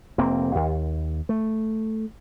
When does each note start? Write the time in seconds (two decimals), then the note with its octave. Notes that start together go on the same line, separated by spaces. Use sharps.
0.18 F1 A#3 C4
0.55 D#2
1.29 A3